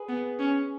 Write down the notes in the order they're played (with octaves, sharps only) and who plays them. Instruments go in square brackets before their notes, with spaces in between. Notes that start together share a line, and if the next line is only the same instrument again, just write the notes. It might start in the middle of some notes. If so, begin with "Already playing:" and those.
Already playing: [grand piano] G#4 B4
[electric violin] B3
C#4